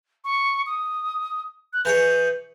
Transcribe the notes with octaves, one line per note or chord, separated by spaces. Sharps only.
C#6
D#6
F#6
E3 G#4 C#5 G6